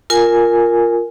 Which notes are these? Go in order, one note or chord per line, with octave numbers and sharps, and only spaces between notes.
F4 A#4 G#5